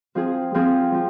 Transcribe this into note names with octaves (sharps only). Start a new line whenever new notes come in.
F3 C4 F4 G#4
F3 C4 F4 G#4
F3